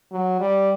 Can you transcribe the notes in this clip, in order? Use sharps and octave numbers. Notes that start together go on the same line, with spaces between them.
F#3
G3